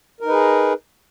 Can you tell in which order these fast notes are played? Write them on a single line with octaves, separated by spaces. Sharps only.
A#4 D#4 B4 G#4